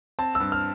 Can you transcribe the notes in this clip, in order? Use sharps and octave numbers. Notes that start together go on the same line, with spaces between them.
C4 A5
E6
G2
F6